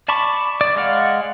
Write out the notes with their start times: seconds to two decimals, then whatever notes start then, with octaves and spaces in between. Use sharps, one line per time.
0.08 D5 A5 B5 C#6 D6
0.61 D5
0.76 G#3 D5 F5 F#5